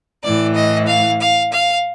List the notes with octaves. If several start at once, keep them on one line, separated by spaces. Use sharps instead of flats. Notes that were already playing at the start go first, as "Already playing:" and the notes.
A2 E3 D5
D#5
F5
F5
F5